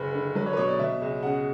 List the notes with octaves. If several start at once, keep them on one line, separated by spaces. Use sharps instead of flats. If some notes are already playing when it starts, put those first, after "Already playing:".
Already playing: F#1 B4
D3
F#3 B4
C#5
B4
B2 C#5
D5
B2 E5
C#2
C#3 F#5